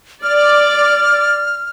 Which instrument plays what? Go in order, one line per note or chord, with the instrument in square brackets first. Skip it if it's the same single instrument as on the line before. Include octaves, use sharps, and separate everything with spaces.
[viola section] D5 [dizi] F6